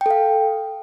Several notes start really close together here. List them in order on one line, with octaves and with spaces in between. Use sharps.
G5 A4 F5